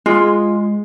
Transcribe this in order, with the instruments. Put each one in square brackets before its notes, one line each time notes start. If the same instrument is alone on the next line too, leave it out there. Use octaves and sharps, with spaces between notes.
[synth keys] G#3 [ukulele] F4